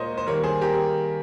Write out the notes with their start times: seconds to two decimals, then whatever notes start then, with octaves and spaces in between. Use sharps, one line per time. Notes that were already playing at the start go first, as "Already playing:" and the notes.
Already playing: A#2 G#3 A#4 C5 C#5 D#5
0.18 C5
0.27 D#3 G3 A#3 A#4 C#5
0.43 G#4 C5
0.61 G4 A#4